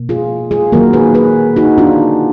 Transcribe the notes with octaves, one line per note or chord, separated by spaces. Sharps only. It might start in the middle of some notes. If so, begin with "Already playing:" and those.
Already playing: B2 A#3
F4 G#4
F4 G#4
D#3 F#3 A#3 F#4 A#4
G#4 B4
G#4 B4
D#4 F#4
D4 F4